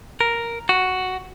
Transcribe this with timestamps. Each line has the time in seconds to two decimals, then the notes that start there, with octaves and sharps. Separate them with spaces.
0.21 A#4
0.69 F#4